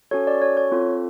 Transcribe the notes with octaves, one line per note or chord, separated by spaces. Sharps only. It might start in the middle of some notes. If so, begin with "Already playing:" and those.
C#4 F#4 A4 C#5
D5
C#5
C#5
C4 F4 A4